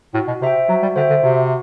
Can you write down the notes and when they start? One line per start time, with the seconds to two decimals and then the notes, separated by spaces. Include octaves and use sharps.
0.14 A2 F#4
0.28 B2
0.42 C3 C5 E5 G5
0.69 F#3 F#4
0.83 G3
0.96 D3 C5 E5 G5
1.10 D3
1.23 C3 F#4